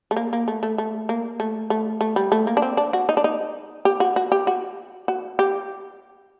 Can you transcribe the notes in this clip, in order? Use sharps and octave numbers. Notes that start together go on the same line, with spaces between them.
A3
A#3
A#3
A3
A3
A3
A#3
A3
A3
A3
G3
A3
A#3
D4
C4
D4
F#4
D#4
D4
D#4
G4
F#4
F#4
G4
F#4
F#4
G4